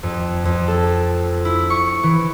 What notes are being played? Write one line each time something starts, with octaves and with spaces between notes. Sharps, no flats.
F2
F2
A4
E4
C#6
E3